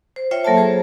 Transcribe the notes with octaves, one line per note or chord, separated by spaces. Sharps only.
C5
F4 C5 C#5 E5 G5
F#3 A#3 A4 C#5 E5 A5
G#4 C5